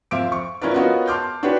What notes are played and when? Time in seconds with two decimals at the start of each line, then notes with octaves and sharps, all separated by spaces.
0.11 F2 C5 E5 F5 D6 D7
0.32 C#6
0.62 F3 C#4 E4 A#4 B4 D5
0.74 B3 F4 F#4 A#4 C#5 D#5
1.07 A5 C6 D6 F6 G6
1.43 D4 F#4 G4 B4 C#5